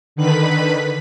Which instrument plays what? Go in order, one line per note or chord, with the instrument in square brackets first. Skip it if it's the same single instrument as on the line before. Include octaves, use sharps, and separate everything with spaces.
[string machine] D3 D#3 B4 B5 B6